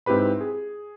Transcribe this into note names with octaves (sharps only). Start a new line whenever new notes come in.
G#2 C4 E4 G4 B4 B5
G#4